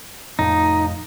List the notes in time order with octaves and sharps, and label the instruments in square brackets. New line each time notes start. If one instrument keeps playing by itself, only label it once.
[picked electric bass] F1 F2 A2 [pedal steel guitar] D#4